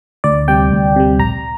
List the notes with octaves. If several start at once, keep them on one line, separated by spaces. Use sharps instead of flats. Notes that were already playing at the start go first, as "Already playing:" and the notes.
D2 D5
C3 G3 G5
D2
C3 G3
A#1 A#5